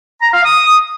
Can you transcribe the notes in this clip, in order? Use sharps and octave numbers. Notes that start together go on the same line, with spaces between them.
A#5
F5
D#6